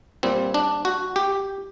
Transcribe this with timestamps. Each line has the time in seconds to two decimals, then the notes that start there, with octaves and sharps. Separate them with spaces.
0.23 A#2 G3 C4
0.54 D4
0.85 F#4
1.16 G4